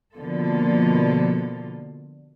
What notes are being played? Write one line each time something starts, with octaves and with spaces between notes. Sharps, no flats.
B2 D3 F3 A#3 F4 A4